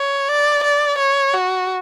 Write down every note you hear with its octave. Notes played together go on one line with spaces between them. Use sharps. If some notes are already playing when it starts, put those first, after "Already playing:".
Already playing: C#5
D5
D5
C#5
F#4